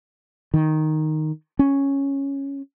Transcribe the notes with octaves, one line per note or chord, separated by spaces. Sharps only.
D#3
C#4